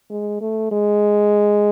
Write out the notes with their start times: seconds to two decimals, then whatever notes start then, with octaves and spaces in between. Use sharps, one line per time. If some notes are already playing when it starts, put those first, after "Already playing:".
0.10 G#3
0.41 A3
0.72 G#3